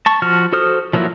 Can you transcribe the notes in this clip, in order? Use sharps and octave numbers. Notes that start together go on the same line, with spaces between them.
A5 C#6
F3 F#4 F6
F#4 A4 C5 D#6 F6
F3 F#3 A#3 E4 F#4